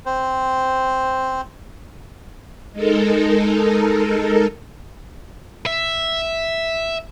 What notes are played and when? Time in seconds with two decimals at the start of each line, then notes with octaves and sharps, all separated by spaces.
0.06 C4 C5
2.72 G#3 D#4 A4 A#4
5.66 E5